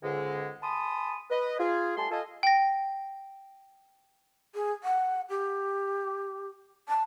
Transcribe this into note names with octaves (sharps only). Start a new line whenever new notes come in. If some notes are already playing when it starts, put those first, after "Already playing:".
C#2 G#2 D3 G#3
G#5 A5 B5 C6 D#6
B4 D#5
F4 G#4
G3 A3 G#5 A5 C6
F4 A4 D#5 G#5
G5 A#6
G#4
F#5
G4
A5